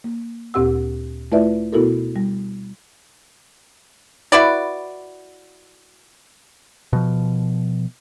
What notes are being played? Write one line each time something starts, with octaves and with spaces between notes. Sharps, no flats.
A#3
D2 A#2 C4 G4 F#5 E6
A3 E4 F4 B4 D5 E5
B2 B3 E4 F#4 A4 A#4
G3
E4 F#4 B4 D5
B2 F3